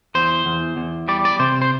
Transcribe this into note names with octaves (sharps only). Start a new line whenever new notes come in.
E2 C5
E2
E2
G3 D5
D5
C3 C5
C5